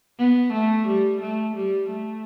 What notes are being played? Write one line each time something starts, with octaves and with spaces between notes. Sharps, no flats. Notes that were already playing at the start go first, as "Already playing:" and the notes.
B3
A3
G3
A3
G3
A3